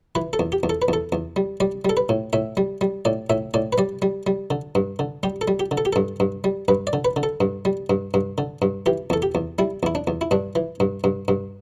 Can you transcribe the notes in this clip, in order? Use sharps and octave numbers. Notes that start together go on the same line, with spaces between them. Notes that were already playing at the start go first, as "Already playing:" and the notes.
E3 B4
A4
E2
G4
E2
A4
B4
E2 A4
E2
G3
G3 D5
G3 A4
B4
A2
A2 E5
G3
G3
A2 D5
A2 E5
A2 D5
B4
G3 D5
G3
G3
D3
G2
D3
G3 G4
A4
G3
G4
D3
A4
G4
G2 A4
G2
G3
G2 B4
D5
D3
B4
D3
A4
G2
G3
G2
G2
D3
G2
E3 G4
E2 A4
G4
E2
G3 E4
E2 E4
D4
E2
E4
G2 D4
E3
G2
G2
G2